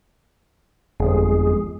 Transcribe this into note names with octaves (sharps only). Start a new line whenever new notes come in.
G1 F2 G#3 G#4